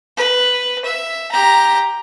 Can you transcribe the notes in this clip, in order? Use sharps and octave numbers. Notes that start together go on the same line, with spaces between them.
B4
E5
G4 A#5